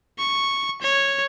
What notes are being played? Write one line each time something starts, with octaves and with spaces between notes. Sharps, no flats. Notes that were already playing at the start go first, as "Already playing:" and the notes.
C#6
C#5